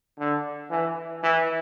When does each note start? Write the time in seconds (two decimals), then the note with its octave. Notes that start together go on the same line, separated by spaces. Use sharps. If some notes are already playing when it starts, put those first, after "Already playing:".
0.19 D3
0.71 E3
1.23 E3